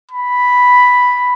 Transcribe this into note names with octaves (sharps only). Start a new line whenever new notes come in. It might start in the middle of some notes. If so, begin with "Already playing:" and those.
B5